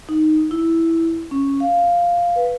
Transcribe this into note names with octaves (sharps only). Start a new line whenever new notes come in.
D#4
E4
C#4
F5
B4